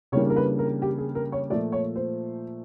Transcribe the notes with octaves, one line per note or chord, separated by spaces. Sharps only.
C#3 E3 G3 A#3 D4 C#5
A#4
B4
A#4
G4
G#4
A#4
C#5
A#2 F3 A3 D5
C#5
C5